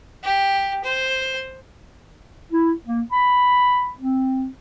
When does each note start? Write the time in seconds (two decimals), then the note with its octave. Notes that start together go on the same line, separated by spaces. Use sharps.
0.23 G4
0.84 C5
2.51 E4
2.85 A#3
3.11 B5
3.99 C4